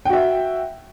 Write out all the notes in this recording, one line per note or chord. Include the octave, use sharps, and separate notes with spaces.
F#4 E5 G5